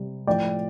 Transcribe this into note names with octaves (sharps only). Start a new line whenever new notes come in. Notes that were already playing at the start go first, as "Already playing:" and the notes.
Already playing: C3 G3
A2 F3 D5 G5